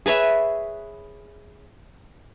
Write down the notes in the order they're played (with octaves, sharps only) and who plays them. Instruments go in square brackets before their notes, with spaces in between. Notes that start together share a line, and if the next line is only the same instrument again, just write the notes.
[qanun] G#4 B4 C#5 E5